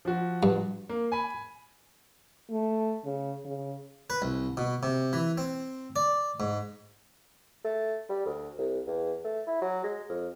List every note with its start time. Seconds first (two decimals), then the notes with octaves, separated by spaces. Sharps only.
0.05 F3 F#4
0.43 G2
0.89 A#3
1.12 G#5 B5
2.50 A3
3.05 C#3
3.45 C#3
4.10 B4
4.22 C2
4.57 B2
4.83 C3
5.13 E3
5.38 C4
5.96 D5
6.40 G#2
7.64 A3
8.09 G3
8.26 D2
8.58 C2
8.87 E2
9.24 A3
9.47 E4
9.61 F#3
9.84 G#3
10.09 F2